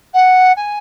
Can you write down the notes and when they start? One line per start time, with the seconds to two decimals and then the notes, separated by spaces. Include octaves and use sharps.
0.13 F#5
0.56 G#5